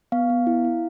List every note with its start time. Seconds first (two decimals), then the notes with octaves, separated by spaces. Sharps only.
0.12 B3 F5
0.30 B3
0.47 E4
0.65 E4